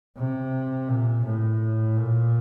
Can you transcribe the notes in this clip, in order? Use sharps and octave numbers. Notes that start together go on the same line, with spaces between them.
C3
A#2
A2
A#2